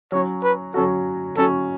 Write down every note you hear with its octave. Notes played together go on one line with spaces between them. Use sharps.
F#3 C#4 F#4 C#5
B4
F#3 C#4 F#4 A4
F#3 C#4 F#4 A4